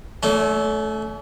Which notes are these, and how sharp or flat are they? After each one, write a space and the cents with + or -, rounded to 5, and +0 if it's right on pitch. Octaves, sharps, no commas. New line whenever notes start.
A3 -15 C#4 +40